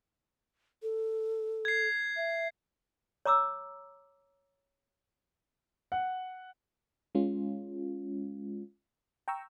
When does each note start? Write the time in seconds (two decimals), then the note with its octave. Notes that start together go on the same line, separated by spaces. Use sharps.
0.82 A4
1.65 G#6 C7
2.17 E5
3.26 C#5 A#5 D6 E6
5.92 F#5
7.15 G#3 C#4 F4
9.28 G5 A#5 C#6 E6